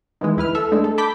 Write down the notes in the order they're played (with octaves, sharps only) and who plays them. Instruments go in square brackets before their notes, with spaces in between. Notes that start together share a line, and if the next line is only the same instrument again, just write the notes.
[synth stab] D#3 E3 G#3
D2 E4 B4 F6
A4 E5
G#3 A3 D4
A4
A5 B5 D6 G6 B6